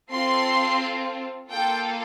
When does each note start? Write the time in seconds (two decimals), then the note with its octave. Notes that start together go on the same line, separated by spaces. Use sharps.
0.10 C4 F4 A4 C6
1.50 A#3 F4 A4 G5